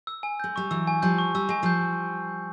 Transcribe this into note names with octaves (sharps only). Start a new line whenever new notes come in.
E6
G#5
G#3 G6
G3 C#6
E3 F#3 E6
G#5
F3 G3 G6
C#6
G3 E6
G#3 G#5
F3 G3 G6